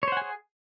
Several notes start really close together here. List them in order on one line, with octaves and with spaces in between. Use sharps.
C#5 C5 F#5 G#5 G#4